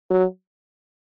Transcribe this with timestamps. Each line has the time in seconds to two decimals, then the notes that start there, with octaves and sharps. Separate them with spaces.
0.10 F#3